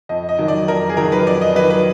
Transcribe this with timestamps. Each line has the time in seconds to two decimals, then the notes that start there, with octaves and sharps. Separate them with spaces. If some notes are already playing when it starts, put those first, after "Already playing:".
0.09 F2 D#5
0.29 D#5
0.39 D#3 F#3
0.48 D5
0.68 F2 A#4
0.89 G#4
0.97 D#3 F#3 A#4
1.12 B4
1.27 F2 D5
1.41 D#5
1.56 D#3 F#3 B4
1.70 B4